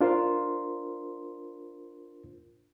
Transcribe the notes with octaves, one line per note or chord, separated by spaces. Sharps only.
D4 F4 A#4 C5 C6